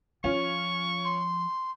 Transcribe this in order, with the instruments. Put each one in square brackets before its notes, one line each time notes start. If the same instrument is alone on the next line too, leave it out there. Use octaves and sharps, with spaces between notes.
[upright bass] F3 [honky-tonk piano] C#4 F4 [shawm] C#6
[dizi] C6